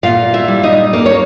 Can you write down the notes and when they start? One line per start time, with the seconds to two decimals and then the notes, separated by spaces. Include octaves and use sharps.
0.03 A#2 F4 F5
0.33 E4 E5
0.48 G3
0.63 D#4 D#5
0.93 A#3 C#4 A#4
1.06 C#5